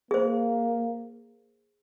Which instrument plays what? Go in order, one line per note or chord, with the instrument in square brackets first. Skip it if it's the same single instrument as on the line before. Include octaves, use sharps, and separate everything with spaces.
[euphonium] A#3 [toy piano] G#4 C5